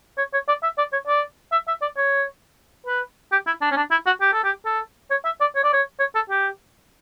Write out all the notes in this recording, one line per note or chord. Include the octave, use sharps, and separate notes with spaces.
C#5
C#5
D5
E5
D5
C#5
D5
E5
E5
D5
C#5
B4
G4
E4
D4
C#4
D4
E4
F#4
G4
A4
G4
A4
C#5
E5
D5
C#5
D5
C#5
C#5
A4
G4